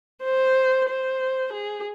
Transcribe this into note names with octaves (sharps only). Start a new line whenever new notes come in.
C5
C5
G#4